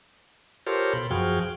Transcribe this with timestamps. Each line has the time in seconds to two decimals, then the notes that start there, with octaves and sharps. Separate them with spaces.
0.67 F4 G4 A4 A#4 C5 C#5
0.93 B2 B5 C6
1.11 F#2 F3 F#4 G#4 G5 F6